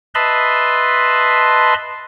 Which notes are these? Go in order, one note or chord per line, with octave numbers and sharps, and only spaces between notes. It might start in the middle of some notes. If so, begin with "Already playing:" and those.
B4 D#5 E5 A5 B5 C6